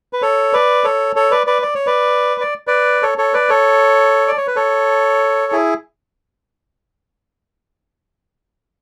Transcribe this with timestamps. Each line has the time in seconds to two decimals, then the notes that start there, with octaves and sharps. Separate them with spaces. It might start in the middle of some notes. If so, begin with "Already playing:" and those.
0.13 B4
0.22 A4 C#5
0.53 B4 D5
0.84 A4 C#5
1.16 A4 C#5
1.31 B4 D5
1.47 B4 D5
1.62 D5
1.75 C#5
1.87 B4 D5
2.40 D5
2.67 B4 D5
3.03 A4 C#5
3.18 A4 C#5
3.34 B4 D5
3.49 A4 C#5
4.28 D5
4.37 C#5
4.47 B4
4.56 A4 C#5
5.52 E4 G#4